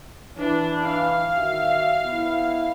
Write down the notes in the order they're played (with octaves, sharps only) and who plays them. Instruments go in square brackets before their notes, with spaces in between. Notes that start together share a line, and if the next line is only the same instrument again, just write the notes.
[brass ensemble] E3 [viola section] D4
[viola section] F5
[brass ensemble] D#3 F#4 E5
B3 E4